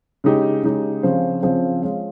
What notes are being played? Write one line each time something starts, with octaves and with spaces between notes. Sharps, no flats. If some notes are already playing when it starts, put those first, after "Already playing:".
C#3 G#3 D#4 G4
C#3 G#3 D#4 G4
C#3 F3 C4 F4 C5
C#3 F3 C4 F4 C5
G#3 C#4 F4